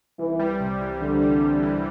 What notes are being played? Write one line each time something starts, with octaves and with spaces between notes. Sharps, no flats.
C2 E3
G3
C3
E3
C2 D3
G3
C3
E3